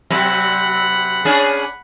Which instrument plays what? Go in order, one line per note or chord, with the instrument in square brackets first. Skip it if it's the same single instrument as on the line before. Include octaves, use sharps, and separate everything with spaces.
[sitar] C3 F#3 C4 [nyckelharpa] F#5 B5
[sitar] C#4 D4 G#4